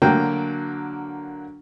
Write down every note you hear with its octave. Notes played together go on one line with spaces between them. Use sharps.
D3 F#3 A#3 G5